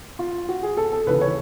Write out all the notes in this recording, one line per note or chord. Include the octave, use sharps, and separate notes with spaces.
F4
F#4
G#4
A4
A4
D#2 C#3 E3 B4
C#5